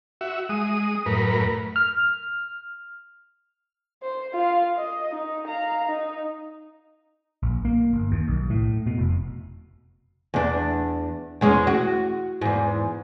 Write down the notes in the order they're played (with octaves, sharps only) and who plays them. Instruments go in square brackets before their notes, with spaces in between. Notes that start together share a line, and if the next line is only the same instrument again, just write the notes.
[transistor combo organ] F#4 E5
G#3 D#6
F#2 A2 A#4 B4
[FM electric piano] F6
[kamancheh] C5
F4 F5
D#5
D#4
F5 A#5
D#4
[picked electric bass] A#1
A#3
G1
D#2
B1
A2
B2
F1
[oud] E2 D4
E2 G#3 C#4
F#4
E2 G#2